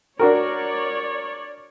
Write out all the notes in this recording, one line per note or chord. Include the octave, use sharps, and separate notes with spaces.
D4 F#4 A#4 C#5 D5